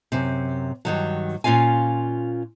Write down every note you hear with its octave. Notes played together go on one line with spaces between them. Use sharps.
F#2 C3
G2 D#3 F#3
A#2 C#4 F4 F5 G#5